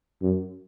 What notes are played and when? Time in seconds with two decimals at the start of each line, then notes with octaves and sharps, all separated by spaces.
0.22 F#2